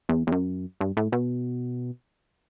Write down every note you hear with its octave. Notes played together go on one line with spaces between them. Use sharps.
E2
E2
F#2
G2
A2
B2